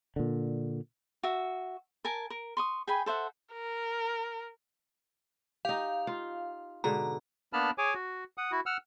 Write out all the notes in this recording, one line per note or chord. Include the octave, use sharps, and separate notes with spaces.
A#2 D3
F#4 E5
A#4 G#5 A5
A#4
C6 C#6 D#6
G#4 G5 G#5 B5
A4 C5 E5 F#5
A#4
D#4 G4 F5
F4
G#2 B2 D3 A#5
A#3 B3 D4 A5 B5 F6
G#4 C#5 G#5 D6
F#4
F#5 D#6
E4 F#4
F#5 E6 F6